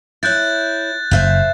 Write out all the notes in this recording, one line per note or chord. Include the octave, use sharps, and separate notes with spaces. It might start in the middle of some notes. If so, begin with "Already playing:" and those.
E4 C#5 F#6 G6 A6
F#1 F#2 C5 E5 F5